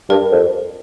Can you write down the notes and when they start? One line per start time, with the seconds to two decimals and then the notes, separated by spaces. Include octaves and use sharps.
0.10 G2 A#4
0.32 F2